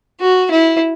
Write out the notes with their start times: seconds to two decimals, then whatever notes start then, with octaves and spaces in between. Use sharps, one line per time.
0.20 F#4
0.51 E4